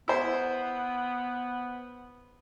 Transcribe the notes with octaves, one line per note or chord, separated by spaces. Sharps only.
B3 E4 C5